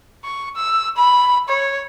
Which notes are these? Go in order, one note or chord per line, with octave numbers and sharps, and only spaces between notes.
C#6
E6
B5
C#5